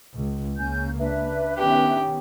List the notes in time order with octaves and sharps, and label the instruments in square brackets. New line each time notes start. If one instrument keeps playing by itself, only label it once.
[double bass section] C#2
[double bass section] C#2 C#3 A#3 [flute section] C#4 G#5 G6
[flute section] D4 B4 E5
[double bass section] D#3 B3 C#4 [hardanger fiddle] G4